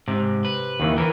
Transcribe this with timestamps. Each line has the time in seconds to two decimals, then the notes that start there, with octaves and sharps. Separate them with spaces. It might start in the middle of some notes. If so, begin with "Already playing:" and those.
0.08 G#2 C3
0.45 B4
0.80 D#2 D#3 E3
0.98 E3 A#4 B4